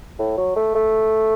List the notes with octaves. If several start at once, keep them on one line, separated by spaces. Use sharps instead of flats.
A2
F#3
A3
A3